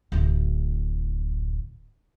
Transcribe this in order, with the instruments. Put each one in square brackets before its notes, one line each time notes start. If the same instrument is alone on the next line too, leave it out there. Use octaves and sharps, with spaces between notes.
[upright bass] D1 A1